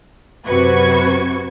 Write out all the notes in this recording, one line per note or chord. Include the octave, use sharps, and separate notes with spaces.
F#2 C3 F#4 B4 C#6 G#6